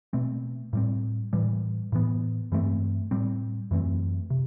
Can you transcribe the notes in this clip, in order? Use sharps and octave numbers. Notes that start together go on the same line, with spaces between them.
B2 A3 C4
A2 G3 C4
A2 E3 G3
A2 E3 B3
G2 E3 A3 C4
A2 G3 C4
F#2 E3 A3 C4
C3